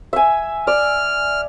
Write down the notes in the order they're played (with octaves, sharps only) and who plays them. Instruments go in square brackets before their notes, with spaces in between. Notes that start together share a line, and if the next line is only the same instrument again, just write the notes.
[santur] E5 G#5
[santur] D5 [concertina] F6